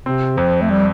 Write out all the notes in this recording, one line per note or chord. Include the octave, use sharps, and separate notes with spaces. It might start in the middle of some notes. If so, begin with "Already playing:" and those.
C3 C4
F2 F3
A3
G3